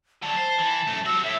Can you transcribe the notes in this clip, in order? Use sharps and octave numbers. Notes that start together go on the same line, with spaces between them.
D3 F#3 A5
C5
E3
F#2 A3
G3 F#4 E6
A2 E5